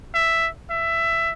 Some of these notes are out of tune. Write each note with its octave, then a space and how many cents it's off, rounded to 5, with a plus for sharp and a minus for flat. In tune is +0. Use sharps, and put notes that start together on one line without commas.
E5 +5
E5 +15